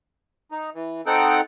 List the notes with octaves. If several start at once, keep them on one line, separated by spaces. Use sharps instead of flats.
D#4
E3
C4 D#4 A4 F#5 G5